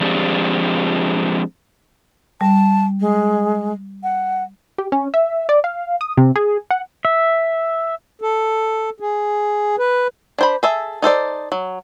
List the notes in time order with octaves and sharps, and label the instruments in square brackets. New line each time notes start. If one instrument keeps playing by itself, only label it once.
[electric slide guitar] F3 G#3 C4 D4 G4
[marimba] G3 [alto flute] A5
[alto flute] G#3
F#5
[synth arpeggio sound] G4
C#4
E5
D5
F5
D#6
C3
G#4
F#5
[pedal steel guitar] E5
[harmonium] A4
G#4
B4
[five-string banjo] D4 C5 B5
G#4 A4 E5
D#4 A4 C5 D5
F#3